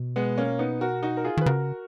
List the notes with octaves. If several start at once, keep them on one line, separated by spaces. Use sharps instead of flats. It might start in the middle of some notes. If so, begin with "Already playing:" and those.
Already playing: B2
G#3 B3
A#3 C#4
B3 D#4
F#4 A#4
D#4 F#4
A#4
F4 G#4
D#3 B4
C#3 F#4 A#4